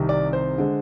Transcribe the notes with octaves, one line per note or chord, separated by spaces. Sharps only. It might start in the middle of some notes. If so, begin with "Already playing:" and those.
Already playing: C2 C3 D#3
D5
C5
D3 G#3